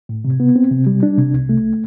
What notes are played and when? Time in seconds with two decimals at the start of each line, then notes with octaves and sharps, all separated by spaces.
0.09 A2
0.25 C3
0.40 B3
0.56 C4
0.72 C3
0.87 G3
1.03 D4
1.18 C3
1.33 C2
1.49 A3